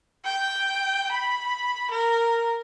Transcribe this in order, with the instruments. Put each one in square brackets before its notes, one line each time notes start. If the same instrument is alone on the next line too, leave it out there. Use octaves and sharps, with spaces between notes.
[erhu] G5
B5
A#4